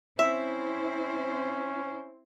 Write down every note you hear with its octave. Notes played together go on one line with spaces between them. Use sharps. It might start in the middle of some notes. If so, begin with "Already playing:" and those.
C4 C#4 E4 C5 E5